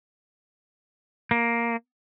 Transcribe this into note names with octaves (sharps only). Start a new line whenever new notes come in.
A#3